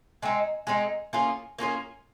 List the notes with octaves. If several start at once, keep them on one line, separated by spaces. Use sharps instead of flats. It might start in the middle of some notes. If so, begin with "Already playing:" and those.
G#3 C4 D#4
G#3 C4 D#4
A#3 C#4 F4 G#4
A#3 C#4 F4 G#4